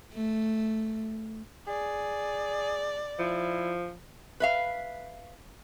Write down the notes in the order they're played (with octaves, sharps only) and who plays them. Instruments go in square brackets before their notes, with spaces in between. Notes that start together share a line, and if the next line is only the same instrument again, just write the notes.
[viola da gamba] A3
[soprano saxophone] G#4 [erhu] D5
[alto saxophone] F3 [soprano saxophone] E4
[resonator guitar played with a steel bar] B4 E5 F5